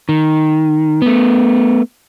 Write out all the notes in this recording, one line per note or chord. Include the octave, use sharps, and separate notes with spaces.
D#3
A3 B3